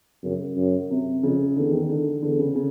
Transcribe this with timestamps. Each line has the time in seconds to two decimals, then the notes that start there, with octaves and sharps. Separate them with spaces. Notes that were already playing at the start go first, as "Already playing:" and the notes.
0.24 F#2 C#3
0.57 F#2
0.90 C3
1.23 F2 C#3
1.56 E2 D3
1.73 D#3
1.89 D3
2.23 E2 D3
2.39 C#3
2.55 C#3